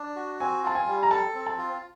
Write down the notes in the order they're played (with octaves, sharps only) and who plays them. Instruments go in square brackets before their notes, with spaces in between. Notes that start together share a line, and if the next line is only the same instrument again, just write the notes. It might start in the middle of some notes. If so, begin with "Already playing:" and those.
Already playing: [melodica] D4
F#4
[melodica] C4 [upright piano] G#5
[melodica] F4 [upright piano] A5
[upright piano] G#5
[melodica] G3
[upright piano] A#5
[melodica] A4 [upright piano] A5
[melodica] C4
[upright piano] A5
[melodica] F4